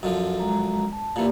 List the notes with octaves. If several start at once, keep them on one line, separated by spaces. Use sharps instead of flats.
F#2 D3 F3
G#3 A#5
A5
A#2 E3 A#3 G4 D5